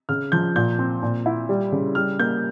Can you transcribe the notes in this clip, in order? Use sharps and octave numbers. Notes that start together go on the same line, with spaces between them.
C#3 F6
F3 G6
A#2 G6
C4
A#2
E4
G3
C#3
G3 F6
A#3 G6